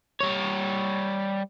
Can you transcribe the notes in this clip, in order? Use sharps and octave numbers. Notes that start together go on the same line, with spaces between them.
G3 C#5